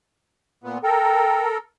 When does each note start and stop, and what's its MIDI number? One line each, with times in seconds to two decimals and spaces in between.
0.64 0.78 46
0.64 0.78 59
0.83 1.58 69
0.83 1.58 70
0.83 1.42 79